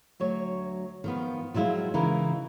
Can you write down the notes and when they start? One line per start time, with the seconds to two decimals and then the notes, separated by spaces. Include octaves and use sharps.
0.20 D2 F#3 C#5
1.04 D#3 F3 B3
1.54 F3 F#3 G#3 E4 F4
1.94 C#3 E3 D#4 E4 A#4